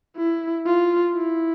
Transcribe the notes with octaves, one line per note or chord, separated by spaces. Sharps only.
E4
F4
E4